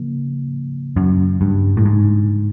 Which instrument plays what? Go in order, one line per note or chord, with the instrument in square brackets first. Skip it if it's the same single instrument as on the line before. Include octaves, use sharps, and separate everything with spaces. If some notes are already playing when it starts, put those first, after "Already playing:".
Already playing: [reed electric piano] C#3 F3 A#3
[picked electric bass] F#2
G2
A2
G#2